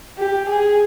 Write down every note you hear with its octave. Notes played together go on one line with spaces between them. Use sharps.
G4
G#4